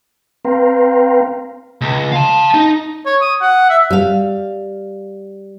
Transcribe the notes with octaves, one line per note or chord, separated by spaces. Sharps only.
C4 B4 F5 G5 A#5 C6
C#2
F5 A5
D#4
C#5
D#6
F#5
E5
G3 F5